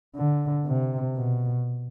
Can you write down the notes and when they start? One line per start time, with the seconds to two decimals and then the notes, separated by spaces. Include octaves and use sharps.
0.16 D3
0.65 C3
1.15 B2